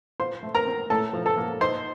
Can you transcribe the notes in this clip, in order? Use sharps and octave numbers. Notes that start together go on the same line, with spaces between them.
F4 C5 C6
A3
A#4 A#5
C4
A2 A4 A5
F3
A4 A5
A#3
D#4 C5 C6